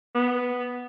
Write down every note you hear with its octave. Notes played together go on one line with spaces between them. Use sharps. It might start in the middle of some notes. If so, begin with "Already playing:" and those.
B3